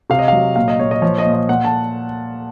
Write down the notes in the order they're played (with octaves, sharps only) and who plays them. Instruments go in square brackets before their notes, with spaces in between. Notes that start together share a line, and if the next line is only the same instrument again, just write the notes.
[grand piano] C3 F5
D#5
F#3 F5
A#2 F5
D#5
A#2 C#5
D#5
F3 C#5
D#5
A#2
D#5
A#2 F#5
A5